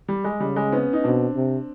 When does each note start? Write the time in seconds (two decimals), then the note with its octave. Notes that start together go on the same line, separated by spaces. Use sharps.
0.08 G3
0.24 G#3
0.40 C#3 G3
0.56 G#3
0.68 C4
0.72 B3 C#4
0.93 D#4
1.04 B2 C4 D4
1.36 C3